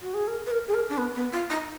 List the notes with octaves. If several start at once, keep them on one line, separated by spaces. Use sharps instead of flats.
F#4
G#4
A#4
B4
A#4
G#4
A#4
D4
B3
B3
F4
D#4